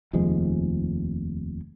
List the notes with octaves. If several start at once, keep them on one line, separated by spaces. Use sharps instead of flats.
F1 D#2 F3 G#3